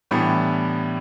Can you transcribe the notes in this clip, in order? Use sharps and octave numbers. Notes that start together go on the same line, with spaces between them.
A2 E3 G3 B3 D4